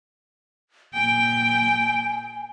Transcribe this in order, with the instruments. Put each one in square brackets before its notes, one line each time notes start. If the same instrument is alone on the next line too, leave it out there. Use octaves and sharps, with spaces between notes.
[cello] A#2 G5 [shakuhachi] G#5